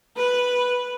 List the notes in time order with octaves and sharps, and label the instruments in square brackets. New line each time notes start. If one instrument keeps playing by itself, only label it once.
[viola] B4